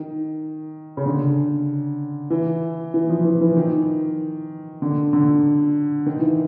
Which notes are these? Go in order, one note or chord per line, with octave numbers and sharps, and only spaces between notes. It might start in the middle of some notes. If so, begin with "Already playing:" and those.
Already playing: D#3
C#3
D3
E3
E3
F3
E3
E3
D#3
D3
D3
D#3
E3